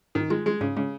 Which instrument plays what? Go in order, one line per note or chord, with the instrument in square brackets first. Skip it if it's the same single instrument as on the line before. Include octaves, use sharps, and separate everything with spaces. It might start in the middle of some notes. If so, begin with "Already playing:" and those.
[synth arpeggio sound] G#2 [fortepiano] D#3
[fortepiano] G#3 [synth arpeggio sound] F4
[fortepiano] G#3 [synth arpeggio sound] F4
[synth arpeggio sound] G#2 [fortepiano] C#3
[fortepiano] C#3 [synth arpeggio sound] G#3